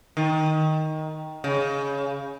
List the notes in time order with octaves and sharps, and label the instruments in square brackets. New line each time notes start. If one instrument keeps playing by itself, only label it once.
[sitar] D#3
C#3